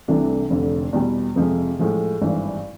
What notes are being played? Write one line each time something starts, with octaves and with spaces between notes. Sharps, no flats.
C2 C3 E3 A3 D4
F1 F2 D3
E2 B2 G3
F2 C3 F3 G#3
A2 F3 G#3
G#1 G2 E3